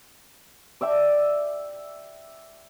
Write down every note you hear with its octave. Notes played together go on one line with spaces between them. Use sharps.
D5 E5 G5 D6